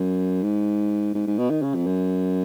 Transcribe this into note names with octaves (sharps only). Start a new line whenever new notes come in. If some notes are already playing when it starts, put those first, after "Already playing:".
Already playing: F#2
G#2
G#2
G#2
B2
D#3
C#3
F2
F#2